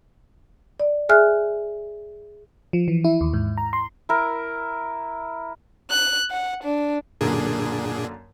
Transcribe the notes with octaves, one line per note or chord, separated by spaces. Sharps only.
D5
G#4 E5 G#5 F6 F#6
F3
E3
E4
D#2
G#2
A#5
C6
E4 A#4
F#6
F#5
D4
F#2 A#2 D3 A#3 D4 G#4